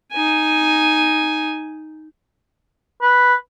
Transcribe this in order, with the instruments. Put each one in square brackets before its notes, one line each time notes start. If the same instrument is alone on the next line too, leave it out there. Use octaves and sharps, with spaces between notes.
[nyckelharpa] D#4 G#5
[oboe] B4